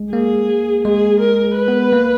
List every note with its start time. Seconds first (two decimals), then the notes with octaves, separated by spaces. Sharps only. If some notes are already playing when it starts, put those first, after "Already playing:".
Already playing: G#3
0.12 A#3 G#4
0.85 G#3 G#4
1.21 A#4
1.57 B4
1.68 B3
1.92 A#3